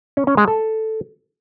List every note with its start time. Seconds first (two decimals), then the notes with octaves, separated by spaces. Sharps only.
0.17 C#4
0.27 C#4
0.37 G#3
0.48 A4